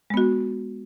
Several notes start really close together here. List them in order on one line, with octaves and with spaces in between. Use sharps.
G#3 B3 F#4